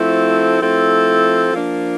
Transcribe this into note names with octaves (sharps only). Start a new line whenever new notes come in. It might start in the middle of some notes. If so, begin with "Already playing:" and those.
Already playing: F3 A3 C4 E4 A4
F3 A3 C4 E4 A4
F3 A#3 D4